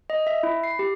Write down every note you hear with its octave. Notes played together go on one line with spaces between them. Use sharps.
D#5
E5
E4
C7
G4